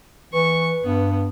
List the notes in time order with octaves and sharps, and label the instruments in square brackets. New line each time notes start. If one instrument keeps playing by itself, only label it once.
[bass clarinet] E3 [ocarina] B4 [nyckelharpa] C#6
[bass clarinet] G2 [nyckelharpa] B3